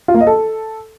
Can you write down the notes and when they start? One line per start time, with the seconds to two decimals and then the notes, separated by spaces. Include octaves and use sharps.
0.08 F4
0.14 A#3
0.21 D#5
0.27 A4